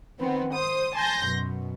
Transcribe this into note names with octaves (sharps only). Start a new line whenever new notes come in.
D#3 B3 C4
C5 D#6
G#5 A5 C6 G6 A#6
F#2 B2